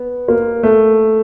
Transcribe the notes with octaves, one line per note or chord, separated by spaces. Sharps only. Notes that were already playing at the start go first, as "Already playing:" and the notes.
Already playing: B3
A#3
A3